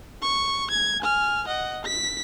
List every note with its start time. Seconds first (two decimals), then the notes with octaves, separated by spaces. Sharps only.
0.22 C#6
0.70 G#6
1.01 G#5 F6
1.47 D#5 F#5
1.85 B6